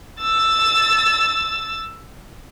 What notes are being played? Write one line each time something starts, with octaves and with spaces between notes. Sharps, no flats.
E6 A6